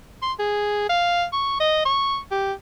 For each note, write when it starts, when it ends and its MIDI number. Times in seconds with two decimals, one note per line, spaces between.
0.22 0.32 84
0.39 0.89 68
0.90 1.25 77
1.33 1.57 85
1.60 1.83 75
1.85 2.18 85
2.31 2.53 67